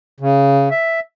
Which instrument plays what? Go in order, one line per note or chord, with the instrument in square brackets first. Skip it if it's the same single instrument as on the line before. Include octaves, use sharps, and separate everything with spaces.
[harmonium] C#3
E5